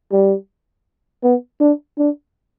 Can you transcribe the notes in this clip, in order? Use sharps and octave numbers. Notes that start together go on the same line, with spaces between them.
G3
B3
D4
D4